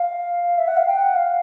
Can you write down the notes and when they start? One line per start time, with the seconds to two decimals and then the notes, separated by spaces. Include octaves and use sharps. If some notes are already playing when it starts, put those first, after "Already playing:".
Already playing: F5
0.58 E5
0.67 F#5
0.77 F5
0.87 G5
0.96 F#5
1.15 F5